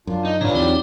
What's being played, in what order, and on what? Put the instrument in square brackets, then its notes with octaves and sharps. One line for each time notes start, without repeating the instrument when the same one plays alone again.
[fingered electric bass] F#2 [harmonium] D4 F4
[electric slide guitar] D#4
[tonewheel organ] G#2 A#5 [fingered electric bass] D3 [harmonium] E3 G3 C#5 [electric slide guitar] D4 F4
[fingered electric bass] E2 [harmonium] F#3 G4 D5 [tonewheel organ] C4 D#4